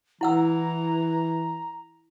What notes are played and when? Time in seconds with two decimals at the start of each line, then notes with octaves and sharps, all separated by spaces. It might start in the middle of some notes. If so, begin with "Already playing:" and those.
0.21 E3 E4 F#5 A#5 E6